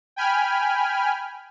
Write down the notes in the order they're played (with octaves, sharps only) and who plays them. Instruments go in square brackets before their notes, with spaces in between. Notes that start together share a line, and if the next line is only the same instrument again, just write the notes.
[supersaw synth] G5 G#5 B5 F6